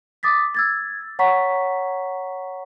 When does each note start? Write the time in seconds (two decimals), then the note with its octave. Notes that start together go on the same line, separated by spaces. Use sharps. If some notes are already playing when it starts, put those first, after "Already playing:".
0.23 D6 D#6 A6 B6
0.55 E6 G#6 A6
1.19 C#5 F#5 A#5 C#6 B6